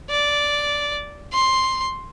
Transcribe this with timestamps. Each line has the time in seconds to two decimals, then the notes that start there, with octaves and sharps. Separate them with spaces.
0.10 D5
1.33 C6